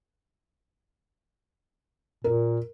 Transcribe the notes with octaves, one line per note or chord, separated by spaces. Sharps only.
A#2 A#4